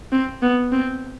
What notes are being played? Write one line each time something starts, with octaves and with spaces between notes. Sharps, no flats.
C4
B3
C4